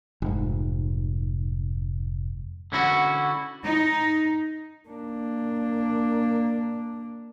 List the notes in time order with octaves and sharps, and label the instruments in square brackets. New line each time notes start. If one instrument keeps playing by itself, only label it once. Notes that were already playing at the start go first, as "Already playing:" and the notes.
[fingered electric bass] F1 G#2
[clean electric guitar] D3 C#4 E4 F#4
[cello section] D#4
[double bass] A#3 D4